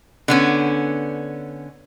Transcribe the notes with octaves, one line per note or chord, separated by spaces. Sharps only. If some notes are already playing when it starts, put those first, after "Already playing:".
D3 B3 C#4